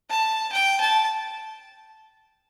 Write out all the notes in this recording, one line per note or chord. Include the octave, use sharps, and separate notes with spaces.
A5
G5
A5